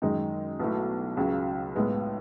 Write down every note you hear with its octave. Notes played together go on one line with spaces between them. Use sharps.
F#2 D#3 G#3 D#4
B1 B2 F#3 A3 E4
C#2 C#3 F#3
B1 A2 G#3 B3